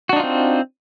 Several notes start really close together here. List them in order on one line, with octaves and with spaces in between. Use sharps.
F#4 D4 D#4 F4 C4